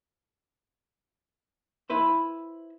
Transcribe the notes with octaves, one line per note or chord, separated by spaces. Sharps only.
E4 B4 C5